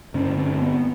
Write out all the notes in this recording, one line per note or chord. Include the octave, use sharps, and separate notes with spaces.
G2 D3 C#4
C4
B3